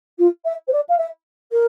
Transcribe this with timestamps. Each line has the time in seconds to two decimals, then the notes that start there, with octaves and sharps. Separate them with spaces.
0.18 F4
0.45 E5
0.67 C5
0.72 D5
0.89 F5
0.98 E5
1.51 A#4